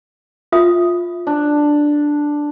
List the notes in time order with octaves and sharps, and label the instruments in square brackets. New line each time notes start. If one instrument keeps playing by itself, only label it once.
[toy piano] F4 E5 D#6
[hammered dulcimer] D4